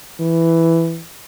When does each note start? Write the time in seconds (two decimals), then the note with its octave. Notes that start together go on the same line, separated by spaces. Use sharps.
0.20 E3